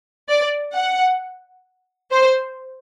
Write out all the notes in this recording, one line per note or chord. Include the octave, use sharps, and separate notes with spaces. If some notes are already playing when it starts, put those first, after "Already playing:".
D5
F#5
C5